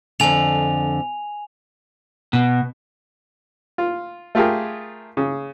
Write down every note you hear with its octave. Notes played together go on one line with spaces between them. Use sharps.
F2 D3 G#5 F7
B2
F4
A3 F4 G4 G#4 A#4
C#3